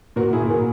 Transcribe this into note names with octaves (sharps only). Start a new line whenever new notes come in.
A#2 F#4 A#4
E4 G#4
A#2
F#4 A#4